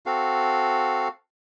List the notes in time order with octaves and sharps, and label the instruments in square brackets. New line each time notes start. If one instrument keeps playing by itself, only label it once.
[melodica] C4 F#4 A4 F5